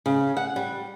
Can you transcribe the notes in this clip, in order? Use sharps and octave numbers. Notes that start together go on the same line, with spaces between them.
C#3
F#5
G3